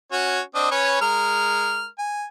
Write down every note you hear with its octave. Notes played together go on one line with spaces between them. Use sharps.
C#4 F#4 C#5
C4 D4 D#5
C#4 B4 C#5
G#3 A#4 F6
G#5